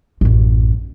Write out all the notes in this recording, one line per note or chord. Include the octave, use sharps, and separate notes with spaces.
A1 F#2